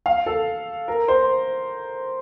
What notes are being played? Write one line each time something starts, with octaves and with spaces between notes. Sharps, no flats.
F5
A4
A#4
C5